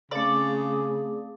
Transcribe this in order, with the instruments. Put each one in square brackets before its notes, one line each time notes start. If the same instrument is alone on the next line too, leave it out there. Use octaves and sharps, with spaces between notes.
[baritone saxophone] C#3 [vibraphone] A3 C4 F5 [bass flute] G#4 [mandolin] D5